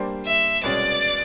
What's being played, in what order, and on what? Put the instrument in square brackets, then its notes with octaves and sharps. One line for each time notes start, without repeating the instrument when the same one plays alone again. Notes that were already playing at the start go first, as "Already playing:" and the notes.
Already playing: [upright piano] G3 A#3 D4 G4 C5
[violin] E5
[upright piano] C2 B2 G#3 C#4 [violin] D5